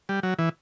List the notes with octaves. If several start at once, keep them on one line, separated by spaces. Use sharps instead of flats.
G3
F#3
E3